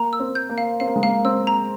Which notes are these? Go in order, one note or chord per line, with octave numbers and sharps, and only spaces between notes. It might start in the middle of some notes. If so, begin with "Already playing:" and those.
Already playing: A#3 A#5
E6
C4
G6
A#3
F5
C4 F5
A#3
G#3
A#3 F5
C4 E6
A#5